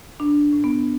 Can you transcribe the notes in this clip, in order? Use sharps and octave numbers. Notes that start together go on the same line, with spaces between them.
A2 D4
D4
A2
B3